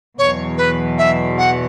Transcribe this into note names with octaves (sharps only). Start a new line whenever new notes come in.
E2 B2 F#3 C#5
B4
E5
F#5